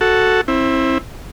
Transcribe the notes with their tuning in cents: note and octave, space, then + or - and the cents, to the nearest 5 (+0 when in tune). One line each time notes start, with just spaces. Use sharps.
F#4 +0 A4 +0
C4 +30 E4 +0